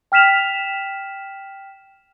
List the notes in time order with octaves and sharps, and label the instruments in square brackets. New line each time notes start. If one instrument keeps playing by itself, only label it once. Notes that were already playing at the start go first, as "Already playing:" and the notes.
[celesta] G5 F6 B6 E7 F7